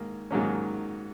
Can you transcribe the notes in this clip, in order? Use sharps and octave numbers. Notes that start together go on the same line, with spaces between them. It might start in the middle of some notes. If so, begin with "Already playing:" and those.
Already playing: G#2 D#3 A#3
G#2 D#3 F#3 A#3 C#4